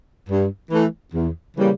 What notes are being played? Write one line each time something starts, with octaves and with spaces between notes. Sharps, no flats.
G2
E3 A3
E2
C#3 E3 G3 A#3